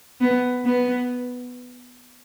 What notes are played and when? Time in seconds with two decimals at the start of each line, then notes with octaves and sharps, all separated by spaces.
0.21 B3
0.65 B3